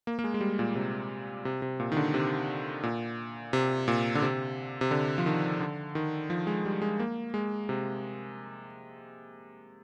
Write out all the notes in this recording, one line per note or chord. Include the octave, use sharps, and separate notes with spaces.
A#3
A#3
G#3
G#3
G3
A#2
C3
C3
C3
A#2
D#3
D3
C3
A#2
C3
A#2
D3
C3
C3
D3
F3
D#3
D3
D#3
F3
G#3
G3
G#3
A#3
G#3
C3